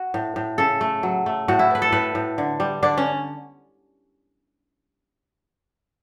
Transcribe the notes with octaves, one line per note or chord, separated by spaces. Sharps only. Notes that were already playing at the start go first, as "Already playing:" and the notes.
Already playing: F#4
A2
A2
C#3 A4
A3
F#3
A3
A2 F#4
E4
B3 B4
A4
A2 B4
A2
D3
G3
D3 D4
C#4